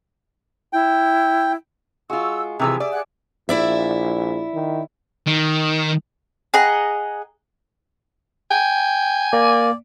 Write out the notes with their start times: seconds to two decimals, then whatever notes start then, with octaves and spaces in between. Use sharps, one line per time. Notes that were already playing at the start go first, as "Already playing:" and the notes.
0.73 E4 G5
2.10 G#3 F4 F#4 E6
2.59 C3 E3 F3 G4 G#4 G#5 E6
2.80 D5 E5 D6
2.92 G#4 F#5 F#6
3.49 A#1 E4 D5 E5
4.54 D#3
5.27 D#3
6.54 G#4 D#5 F#5 A#5
8.51 G5 G#5
9.33 A#3 D5